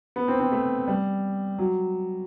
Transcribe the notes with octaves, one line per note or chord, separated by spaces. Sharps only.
B3
C4
C4
A3
G3
F#3